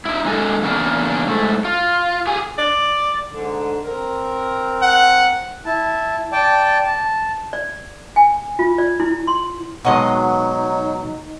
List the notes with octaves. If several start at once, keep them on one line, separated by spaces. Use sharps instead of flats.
D#4 E4
D3 G#3 A#3 A4 D#5
E2 C#3 A#3 D4 D#4
G#2 A3
F4
G4 G#4 G#5
D5
G#2 D3
C4 A#4
F#5
E4 A5
D5 G5 A5
A5
D5
G#5
F4
D5
E4
C6
B2 D#3 F#3 G#3 D#4 F#4 D#5 C6